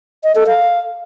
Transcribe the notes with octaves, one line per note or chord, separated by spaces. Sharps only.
D#5
A4
F5